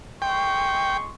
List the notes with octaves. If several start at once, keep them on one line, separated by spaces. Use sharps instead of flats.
G#3 G5 C6 C#6